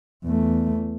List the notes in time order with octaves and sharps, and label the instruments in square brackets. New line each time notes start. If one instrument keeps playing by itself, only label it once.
[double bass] E2 A3